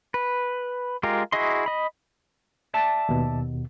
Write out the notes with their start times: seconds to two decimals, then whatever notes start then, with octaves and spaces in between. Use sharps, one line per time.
0.14 B4
1.03 G#3 F4 G4 A#4
1.32 E4 F#4 G#4 D#5 C6
1.66 D#5 B5
2.74 D5 E5 A5
3.09 D#2 B2